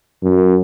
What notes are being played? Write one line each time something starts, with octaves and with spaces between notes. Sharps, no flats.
F#2